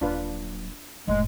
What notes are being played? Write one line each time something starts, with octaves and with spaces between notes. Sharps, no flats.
D#1 F#3 D4 F4 B4
F1 A2 G#3